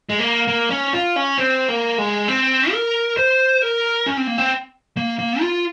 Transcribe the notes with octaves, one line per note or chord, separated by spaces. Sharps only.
G#3
A#3
A#3
C#4
F4
C#4
C4
A#3
G#3
C4
A#4
C5
A#4
C#4
C4
A#3
C4
A#3
A#3
F4